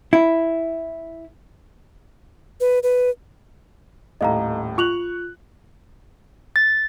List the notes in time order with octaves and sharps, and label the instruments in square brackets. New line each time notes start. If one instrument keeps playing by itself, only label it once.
[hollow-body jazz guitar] E4
[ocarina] B4
B4
[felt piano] D#1 A2 [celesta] D#5 F5 A#5
[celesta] F4 F7 F#7 [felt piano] C#6 F#6
[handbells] A6